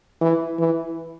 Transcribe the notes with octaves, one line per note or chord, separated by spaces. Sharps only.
E3
E3